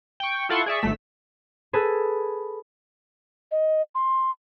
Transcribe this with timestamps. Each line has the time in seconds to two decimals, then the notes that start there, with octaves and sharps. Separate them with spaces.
0.20 G5 C#6
0.49 E4 F4 A4 F#5 C6 C#6
0.66 G#4 D5 E5 C#6
0.81 G#1 A3 B6 E7
1.73 G#4 A4 B4
3.51 D#5
3.95 C6